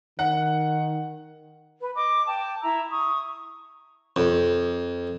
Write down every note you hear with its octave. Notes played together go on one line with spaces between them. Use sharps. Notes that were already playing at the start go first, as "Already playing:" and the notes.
D#3 F#5
B4
D#5 D6
G5 A5
E4 E5 A#5 E6
C#6 D#6
F2